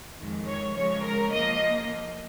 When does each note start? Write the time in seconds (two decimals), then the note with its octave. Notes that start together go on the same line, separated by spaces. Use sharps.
0.18 F2 D#3 G#3
0.47 C#5
0.75 C#3 F3 G#3 C#5
1.03 A#4
1.32 F3 A#3 D#5